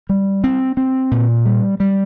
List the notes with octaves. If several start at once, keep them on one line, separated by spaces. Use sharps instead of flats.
G3
C4
C4
A#2
G3
G3